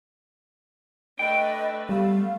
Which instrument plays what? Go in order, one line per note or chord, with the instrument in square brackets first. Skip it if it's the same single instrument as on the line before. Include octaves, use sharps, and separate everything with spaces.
[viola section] A3 D4 B4 [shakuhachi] D#5 [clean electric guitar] G5
[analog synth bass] G3 [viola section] A3 B3 [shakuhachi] F5